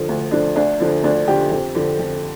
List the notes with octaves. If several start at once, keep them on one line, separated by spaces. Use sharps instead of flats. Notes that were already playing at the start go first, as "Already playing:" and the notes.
Already playing: D3 F3
D2
D3 F3 D4
D2 D4
D3 F3
D2 D4
D3 F3 G4
F2
D3 F3
F2